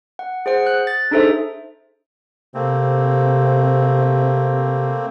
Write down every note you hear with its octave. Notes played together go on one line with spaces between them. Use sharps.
F#5
G#4 C5 F#5
F#6
A6
D4 D#4 G#4 A4 C5 E5
C3 A3 A#3 C4